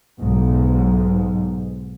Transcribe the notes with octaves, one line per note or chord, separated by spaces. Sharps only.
B1 G#2